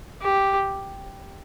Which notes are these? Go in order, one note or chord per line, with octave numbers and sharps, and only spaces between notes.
G4